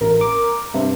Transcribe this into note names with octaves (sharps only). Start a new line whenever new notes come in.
A1 A#4
D6
G2 C3